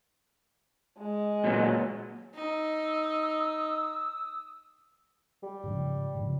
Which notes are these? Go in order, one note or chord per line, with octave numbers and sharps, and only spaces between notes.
G#3
A#2 F#3 B3
D#4 D#6 E6
G3
G#2 C#3 F3
G#2 C#3 F3